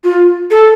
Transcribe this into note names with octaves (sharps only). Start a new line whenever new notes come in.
F4
A4